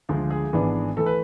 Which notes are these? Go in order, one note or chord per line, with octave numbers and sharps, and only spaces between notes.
D2 D3 F3 G#3 F4
G#4
G#1 G#2 E3 B3 D4
E3 A3 A4
B4